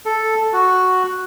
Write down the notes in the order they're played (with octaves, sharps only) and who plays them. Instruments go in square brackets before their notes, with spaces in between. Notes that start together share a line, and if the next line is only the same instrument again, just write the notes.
[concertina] A4
F#4